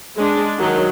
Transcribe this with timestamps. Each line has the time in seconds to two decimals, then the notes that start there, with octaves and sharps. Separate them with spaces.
0.18 G#3 D4
0.58 D#3 F#3